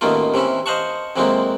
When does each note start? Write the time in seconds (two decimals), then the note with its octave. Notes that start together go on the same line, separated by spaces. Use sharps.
0.01 A1 B2 D#3 A3 A#3 F4
0.34 C3 E3 C#4 E4
0.66 C5 D#5 F5 F#5 A5 C#6
1.16 F2 E3 F#3 G#3 A#3 C4